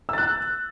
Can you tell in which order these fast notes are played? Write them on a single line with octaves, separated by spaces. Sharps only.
E6 A6 F#6